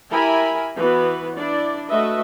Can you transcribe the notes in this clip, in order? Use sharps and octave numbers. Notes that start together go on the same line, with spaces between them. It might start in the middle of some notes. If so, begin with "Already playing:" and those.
E4 G4 A#4 E5 G#5 B5
E3 B3 F#4 B4
D4 E4 D5
A3 F#4 B4 D#5 E5